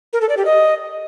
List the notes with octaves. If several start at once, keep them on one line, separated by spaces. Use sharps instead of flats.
A#4
A4
D5
G4
D#5